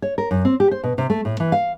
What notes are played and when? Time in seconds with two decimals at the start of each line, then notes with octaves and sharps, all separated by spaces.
0.02 C#5
0.18 A#4
0.31 F#2
0.45 C4
0.60 G4
0.71 C5
0.84 B2
0.98 C3
1.10 A3
1.25 A2
1.40 E3
1.52 F5